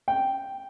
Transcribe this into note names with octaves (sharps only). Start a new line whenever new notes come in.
G5